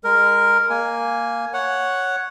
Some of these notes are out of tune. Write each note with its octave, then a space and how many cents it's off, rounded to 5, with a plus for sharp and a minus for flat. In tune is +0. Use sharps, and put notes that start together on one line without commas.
G#3 -25 A#4 +0
A#3 +0 G#5 +0
C#5 +0 F#5 +0